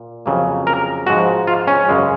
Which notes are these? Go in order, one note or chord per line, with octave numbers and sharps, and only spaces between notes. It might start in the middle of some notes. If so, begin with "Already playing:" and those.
Already playing: A#2
F2 C#3 F#3 A#3
A#4
G#2 F3 G#3 F#4
F4
C#4
F#2 C#3 G#3